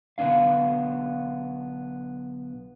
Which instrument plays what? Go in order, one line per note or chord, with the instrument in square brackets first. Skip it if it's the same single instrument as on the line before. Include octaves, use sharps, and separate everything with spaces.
[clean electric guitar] B1 D3 B3 D4 F5